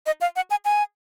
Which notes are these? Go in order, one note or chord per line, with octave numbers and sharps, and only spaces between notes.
D#5
F5
F#5
G#5
G#5